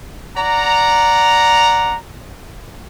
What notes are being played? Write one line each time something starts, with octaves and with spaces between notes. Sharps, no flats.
D5 F#5 A#5